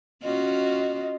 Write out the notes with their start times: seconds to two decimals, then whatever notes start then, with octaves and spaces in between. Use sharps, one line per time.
0.23 C#4 F4 F#4 D#5